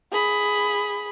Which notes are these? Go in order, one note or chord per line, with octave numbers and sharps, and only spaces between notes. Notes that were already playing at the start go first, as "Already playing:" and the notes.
G#4 B5